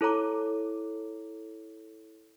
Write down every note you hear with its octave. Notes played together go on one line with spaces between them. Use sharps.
E4 A4 C#5 A#5 D6